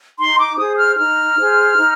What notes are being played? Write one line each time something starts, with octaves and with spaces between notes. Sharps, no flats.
D#4 C6
D6
G#4 C5 D#6
F6
D#4 F6
G#4 C5
D#4